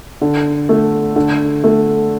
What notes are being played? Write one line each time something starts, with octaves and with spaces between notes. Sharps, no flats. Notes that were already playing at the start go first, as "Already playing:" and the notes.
D3
A3
D3
A3